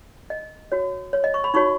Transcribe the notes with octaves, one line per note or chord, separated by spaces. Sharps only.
D#5
F#4 C#5
C#5
D#5
C#6
B5
D#4 F#4 C#5 C#6